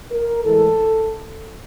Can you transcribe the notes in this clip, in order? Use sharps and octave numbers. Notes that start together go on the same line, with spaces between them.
A#4
A2 E3 G#3 A4